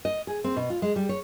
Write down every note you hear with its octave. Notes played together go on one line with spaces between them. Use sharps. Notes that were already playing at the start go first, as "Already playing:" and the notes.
D#5
G#4
C4
B2
F4
G#3
G3
C#5